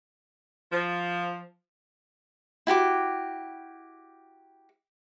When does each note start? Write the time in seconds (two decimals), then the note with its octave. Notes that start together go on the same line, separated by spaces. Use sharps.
0.72 F3
2.67 E4 F#4 G4 D6